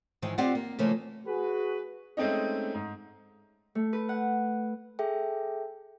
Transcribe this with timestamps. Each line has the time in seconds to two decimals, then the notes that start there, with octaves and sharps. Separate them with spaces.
0.22 G#2 D#3 E3 G#3
0.38 C4 F4 G4 D5 D#5 F#5
0.55 A#3
0.79 C#3 E3 F3 A3 A#3
1.27 F#4 G#4 B4
2.17 G#3 A3 C4 C#4 D#4
2.75 G#2
3.75 A3
3.93 B4
4.09 F#5
4.99 G#4 A4 E5 G5